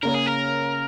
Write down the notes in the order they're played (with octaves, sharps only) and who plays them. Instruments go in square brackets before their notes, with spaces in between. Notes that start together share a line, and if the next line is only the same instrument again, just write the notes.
[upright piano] C#3 A#3 C#4 [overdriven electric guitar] A#4
[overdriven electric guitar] G#4
A#4